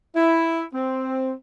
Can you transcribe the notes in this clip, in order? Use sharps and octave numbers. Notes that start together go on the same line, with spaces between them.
E4
C4